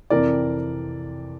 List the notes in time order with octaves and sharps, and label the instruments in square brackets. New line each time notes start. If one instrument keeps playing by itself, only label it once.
[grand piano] F2 C3 E3 A#4 D5